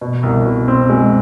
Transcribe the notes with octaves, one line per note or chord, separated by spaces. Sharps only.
B2
C2
B2
C4
G#3